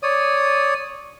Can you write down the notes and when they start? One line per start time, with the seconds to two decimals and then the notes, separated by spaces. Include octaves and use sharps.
0.03 C#5 D5 D#6